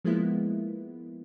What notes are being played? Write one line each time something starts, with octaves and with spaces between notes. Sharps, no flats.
F3 G#3 A#3 B3 E4